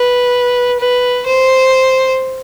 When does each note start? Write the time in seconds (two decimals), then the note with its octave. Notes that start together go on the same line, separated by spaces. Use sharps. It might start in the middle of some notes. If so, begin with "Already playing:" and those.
Already playing: B4
0.80 B4
1.26 C5